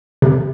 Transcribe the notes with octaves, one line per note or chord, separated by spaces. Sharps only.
C3